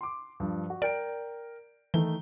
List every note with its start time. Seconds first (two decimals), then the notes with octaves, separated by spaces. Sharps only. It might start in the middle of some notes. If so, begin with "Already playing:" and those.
0.01 C6 D6
0.40 G2 F3
0.70 F#4
0.82 A#4 D5 G5 D7
1.94 D#3 E3 A3 G7